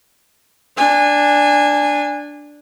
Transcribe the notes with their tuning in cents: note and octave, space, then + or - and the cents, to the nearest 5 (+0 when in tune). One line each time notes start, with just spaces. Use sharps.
D4 +0 G#5 -20